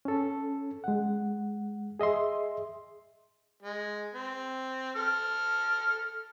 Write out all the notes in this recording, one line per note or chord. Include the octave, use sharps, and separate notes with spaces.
C#4 A4
G#3 F#5
G#4 D#5 E5 C6
G#3
C4
A4 F6